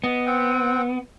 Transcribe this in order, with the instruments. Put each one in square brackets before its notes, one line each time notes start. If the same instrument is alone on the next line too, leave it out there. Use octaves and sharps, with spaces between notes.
[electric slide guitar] B3 [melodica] D#5
[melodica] C4 F#5 G5